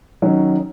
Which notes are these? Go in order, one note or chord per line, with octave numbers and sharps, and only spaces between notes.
D#3 F#3 C#4